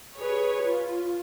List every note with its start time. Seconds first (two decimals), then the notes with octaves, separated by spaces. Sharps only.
0.19 G#4 B4 C#5
0.62 F4